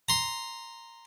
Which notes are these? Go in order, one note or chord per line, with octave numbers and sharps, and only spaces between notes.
A#5 C6